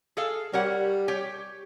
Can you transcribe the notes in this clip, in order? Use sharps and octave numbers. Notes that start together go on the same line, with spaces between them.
G#4 A4 F5
G3 A#4 C#5 F#5
G4 C#5